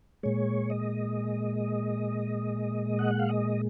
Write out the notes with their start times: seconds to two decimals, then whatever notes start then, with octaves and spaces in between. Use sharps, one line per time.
0.23 A#2 G#3 C#5
0.70 D#5
2.99 F#5
3.19 F5
3.29 D#5